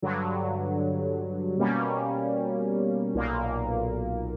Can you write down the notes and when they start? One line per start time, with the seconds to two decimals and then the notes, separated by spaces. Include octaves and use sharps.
0.02 G2 D3 F#3
1.58 B2 G3 A#3 C#4
3.15 B1 A#2 A#3